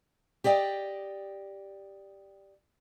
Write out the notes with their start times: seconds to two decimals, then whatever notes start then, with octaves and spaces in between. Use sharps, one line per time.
0.44 G4 D5 D#5 G5